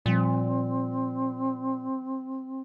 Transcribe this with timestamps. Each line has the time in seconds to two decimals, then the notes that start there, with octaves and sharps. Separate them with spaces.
0.06 A#2 F3 G3 C4